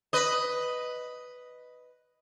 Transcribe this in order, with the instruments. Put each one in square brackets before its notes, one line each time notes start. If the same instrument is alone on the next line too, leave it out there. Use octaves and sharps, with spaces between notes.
[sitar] B4 D#5